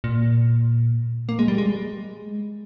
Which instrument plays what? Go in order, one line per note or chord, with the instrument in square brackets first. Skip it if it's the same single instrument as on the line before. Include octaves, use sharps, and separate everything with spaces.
[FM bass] A#2
A#3
G#3
G3
G#3